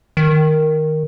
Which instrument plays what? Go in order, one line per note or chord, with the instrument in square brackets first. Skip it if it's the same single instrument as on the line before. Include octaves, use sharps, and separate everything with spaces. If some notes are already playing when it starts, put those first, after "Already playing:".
[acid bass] D#3